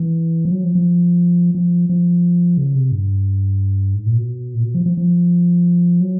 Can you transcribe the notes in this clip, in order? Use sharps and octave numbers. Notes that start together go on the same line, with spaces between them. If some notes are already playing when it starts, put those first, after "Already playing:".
Already playing: E3
F3
F#3
F3
F3
F3
F3
C#3
C3
G2
G#2
A#2
B2
A#2
B2
F3
F3
F3
F#3